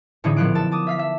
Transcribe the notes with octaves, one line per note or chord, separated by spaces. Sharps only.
A2 D3 E3 C#4 D#4 G#4
A#1 F3 B3 F4 F#6 D7
A4 A5
A5 D6 D#6
E5 F5 B6
E5